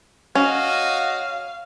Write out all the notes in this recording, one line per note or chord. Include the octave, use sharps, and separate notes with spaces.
C#4 F#4 D#5 F5